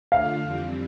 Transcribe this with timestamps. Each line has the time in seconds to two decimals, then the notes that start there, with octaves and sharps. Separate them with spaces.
0.12 D3 A3 D4 F4 F5
0.42 F2 E3 G3 C4